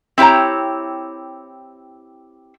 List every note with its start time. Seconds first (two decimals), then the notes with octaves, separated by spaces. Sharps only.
0.18 C4 E4 G4 C#5 A#5